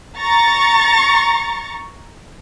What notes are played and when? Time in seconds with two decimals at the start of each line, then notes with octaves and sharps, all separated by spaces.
0.17 A#5 C#6 A6